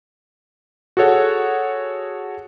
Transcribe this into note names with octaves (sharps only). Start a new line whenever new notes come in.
F#4 G#4 A4 C#5 F#5